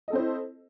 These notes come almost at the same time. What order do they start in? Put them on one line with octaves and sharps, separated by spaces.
D#5 A4 C4 C5 E4